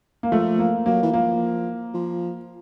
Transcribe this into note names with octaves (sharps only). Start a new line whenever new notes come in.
A#3
F3 A3
A#3
F#3 A#3
E3
F3 A#3
F3